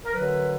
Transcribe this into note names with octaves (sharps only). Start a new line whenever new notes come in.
A#4
F#2 D3 F#3 B4